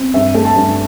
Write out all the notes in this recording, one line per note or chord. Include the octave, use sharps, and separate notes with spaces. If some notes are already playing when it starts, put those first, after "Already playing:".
Already playing: C4
G2 E5
A3
A5
G2